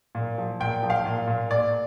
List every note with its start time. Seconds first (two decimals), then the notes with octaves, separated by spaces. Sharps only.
0.15 A#2
0.38 F3
0.60 A#2 G5
0.83 F3
0.90 F5
1.06 A#2
1.27 A#2
1.50 A#2 D5